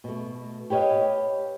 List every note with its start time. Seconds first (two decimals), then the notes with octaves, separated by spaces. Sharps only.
0.04 B2 A3
0.70 G4 B4 C#5 D#5 F5